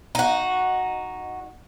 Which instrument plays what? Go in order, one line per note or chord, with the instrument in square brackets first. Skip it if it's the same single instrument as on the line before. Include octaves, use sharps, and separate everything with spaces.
[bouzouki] D#4 F#4